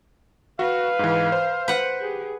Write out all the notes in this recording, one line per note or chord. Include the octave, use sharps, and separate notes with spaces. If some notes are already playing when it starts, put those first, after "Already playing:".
F#4 B4 F5
G#2 E3
C5
B4 F#5
G4 G#4